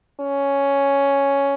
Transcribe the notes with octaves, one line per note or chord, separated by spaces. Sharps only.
C#4